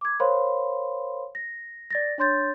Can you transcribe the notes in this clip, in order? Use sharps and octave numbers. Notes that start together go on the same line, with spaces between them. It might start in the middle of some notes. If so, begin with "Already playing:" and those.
D6 G#6
A#4 C5 C#5 F5 B5 C6
A#6
D5 A6 A#6
D4 C#5 C6 G6 A6